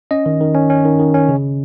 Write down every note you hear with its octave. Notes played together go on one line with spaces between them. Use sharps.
C#4 D#5
D#3
D#3
C#4
C#4
D#3
D#3
C#4
C#3